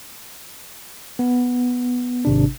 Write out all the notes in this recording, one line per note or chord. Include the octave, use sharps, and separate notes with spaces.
B3
G#1 C3 D4